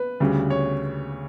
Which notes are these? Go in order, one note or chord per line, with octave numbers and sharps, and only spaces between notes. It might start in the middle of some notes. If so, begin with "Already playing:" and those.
Already playing: B4
D2 C#3 G3
C#5